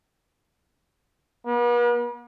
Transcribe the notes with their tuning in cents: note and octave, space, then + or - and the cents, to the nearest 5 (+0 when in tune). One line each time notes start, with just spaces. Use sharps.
B3 -45